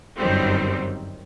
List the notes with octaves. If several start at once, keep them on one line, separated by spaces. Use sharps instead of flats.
G1 F#2 D#3 G3 C4